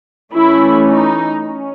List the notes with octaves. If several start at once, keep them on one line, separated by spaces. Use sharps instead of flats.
E3 A3 C#4 E4
D#4
C#4